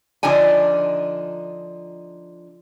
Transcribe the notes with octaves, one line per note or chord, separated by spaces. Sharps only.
D3 F3 D4 D#4 G#5